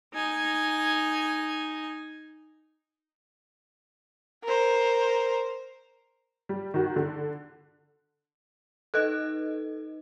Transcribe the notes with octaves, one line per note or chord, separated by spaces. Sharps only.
D#4 G#5
A#4 C5
G3
D#3 F#4
D3
D#4 A4 B4 D#5 F#6